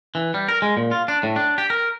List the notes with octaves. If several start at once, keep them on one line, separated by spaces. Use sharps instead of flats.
E3
G3
A#4
G#3
A#2
F4
D4
A2
D4
G4
A#4